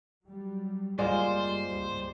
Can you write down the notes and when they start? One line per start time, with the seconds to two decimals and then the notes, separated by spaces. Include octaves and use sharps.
0.24 F#3 G3
0.99 F#1 G3 G#3 A#3 F4 C5 D5
1.70 C#2 G2 G3